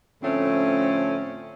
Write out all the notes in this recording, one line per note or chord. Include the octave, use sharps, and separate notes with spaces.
A2 D3 F3 A3 C4 C#4